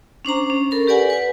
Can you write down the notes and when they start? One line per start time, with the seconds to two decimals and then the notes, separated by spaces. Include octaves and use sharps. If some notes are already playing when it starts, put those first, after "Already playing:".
0.25 C#4 D4 C5 A#5
0.50 C#4
0.71 A4 A#4 B5
0.87 G4 B4 D5 F#5 G#5
1.10 B4 G#5